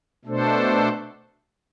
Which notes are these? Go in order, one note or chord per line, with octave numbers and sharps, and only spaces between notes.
B2 A3 D4 A4 C5